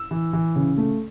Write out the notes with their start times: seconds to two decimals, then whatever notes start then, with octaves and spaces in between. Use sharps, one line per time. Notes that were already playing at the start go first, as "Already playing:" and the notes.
Already playing: E6
0.11 E3
0.33 E3
0.56 C#3
0.77 A3